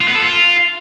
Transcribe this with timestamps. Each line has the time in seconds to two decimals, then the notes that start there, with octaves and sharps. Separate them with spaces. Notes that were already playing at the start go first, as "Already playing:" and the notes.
0.01 F4
0.08 B3
0.15 A4
0.22 F4